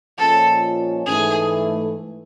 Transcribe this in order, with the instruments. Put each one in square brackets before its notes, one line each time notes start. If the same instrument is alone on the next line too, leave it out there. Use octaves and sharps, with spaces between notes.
[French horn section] A#2 F3 G#3 C#4 [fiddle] A4
[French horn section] G#2 E3 A3 [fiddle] G#4